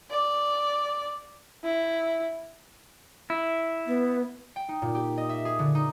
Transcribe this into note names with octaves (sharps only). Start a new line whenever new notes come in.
D5
E4
E4
B3
G5
D#4
A#2
G4
D#5
E5
G#4
D3
D#4